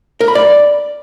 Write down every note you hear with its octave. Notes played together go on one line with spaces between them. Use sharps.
A#4
B5
D5